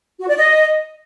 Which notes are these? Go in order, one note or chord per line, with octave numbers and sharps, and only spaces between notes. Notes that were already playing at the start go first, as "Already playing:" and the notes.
F#4
D5
D#5